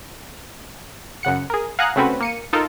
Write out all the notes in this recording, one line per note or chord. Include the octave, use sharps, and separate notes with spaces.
F#2 C#3 F#5 C#7
G#4 A#4
F5 F#5 G#5 A#5 D#6 F#6
C#3 A3 C4 C#4 F#4 B4
A#3 C#7 D#7
D#4 F4 A4 A#4